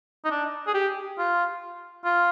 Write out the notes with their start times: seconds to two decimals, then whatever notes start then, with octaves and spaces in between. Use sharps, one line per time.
0.24 D#4
0.31 D4
0.67 G#4
0.74 G4
1.18 F4
2.04 F4